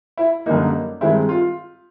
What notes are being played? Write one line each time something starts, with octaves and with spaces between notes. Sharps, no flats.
E4
F#2 D3 G3 A#3 D#4
G2 D#3 G#3 C4 E4
F4